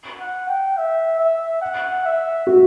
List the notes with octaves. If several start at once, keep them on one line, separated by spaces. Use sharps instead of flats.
F#5
G5
E5
E5
F#5
E5
F#4